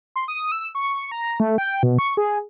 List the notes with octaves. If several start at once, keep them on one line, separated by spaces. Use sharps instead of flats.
C6
D#6
E6
C#6
A#5
A3
G5
B2
C#6
G#4